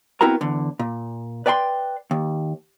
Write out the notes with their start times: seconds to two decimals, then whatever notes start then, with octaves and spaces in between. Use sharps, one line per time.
0.21 B3 C4 E4 F#4 A#4 A#5
0.41 E2 D3
0.79 A#2
1.46 B4 D5 G5 G#5 C6
2.11 D#2